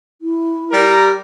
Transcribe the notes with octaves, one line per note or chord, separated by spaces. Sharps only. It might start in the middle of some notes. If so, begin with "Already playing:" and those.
E4
G3 A#4